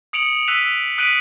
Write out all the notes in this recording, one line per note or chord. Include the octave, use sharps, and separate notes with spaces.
D#6 C#7 D7 F7 F#7
E6 F#6 B6 D7 D#7 F7
D#6 F#6 B6 D7 D#7 F#7